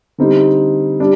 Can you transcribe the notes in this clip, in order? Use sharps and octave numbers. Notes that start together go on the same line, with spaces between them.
D3 G3 C4 D#4
G3 D4